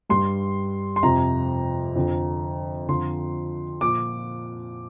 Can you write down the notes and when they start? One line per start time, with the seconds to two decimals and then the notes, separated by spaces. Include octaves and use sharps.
0.09 G2 G3 C6
0.96 C6
1.03 F2 C3 F3 A#5
1.96 F2 D3 F3
2.88 F2 D3 F3 C6
3.81 A#2 F3 D6